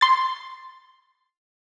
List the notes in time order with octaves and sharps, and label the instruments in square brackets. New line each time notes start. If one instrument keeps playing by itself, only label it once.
[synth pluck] C6 A6